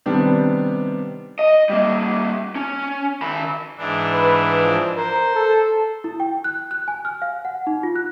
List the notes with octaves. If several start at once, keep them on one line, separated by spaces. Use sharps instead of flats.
C3 D#3 G3 B3 D4 G4
D#5
G3 A#3
C#4
D#3 B5
G#2 E3 D4
B4
F3
A#4 C5
A4
E4
G5
F#6
F#6
G#5
F6
F5
F#5
D#4
F4
F#6